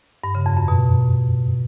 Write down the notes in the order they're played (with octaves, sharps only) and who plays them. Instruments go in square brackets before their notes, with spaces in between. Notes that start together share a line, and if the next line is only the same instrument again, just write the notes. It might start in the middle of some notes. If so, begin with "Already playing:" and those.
[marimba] G2
C#3
F2
F#2
B2